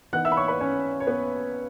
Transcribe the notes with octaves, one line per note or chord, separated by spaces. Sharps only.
E3 B3 D#4 F#5 F#6
E5 E6
B5
C#5 C#6
B4 B5
C#4 C#5
C#5
B3 B4